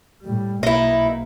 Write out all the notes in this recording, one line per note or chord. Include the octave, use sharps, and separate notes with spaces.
A2 G3
B1 A#3 D#4 E4